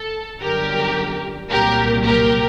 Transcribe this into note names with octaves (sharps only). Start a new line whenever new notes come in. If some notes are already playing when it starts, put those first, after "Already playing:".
Already playing: A4
G1 F#2 D3 G4 A#4
C2 A#2 F#3 G4 A#4
G4 A#4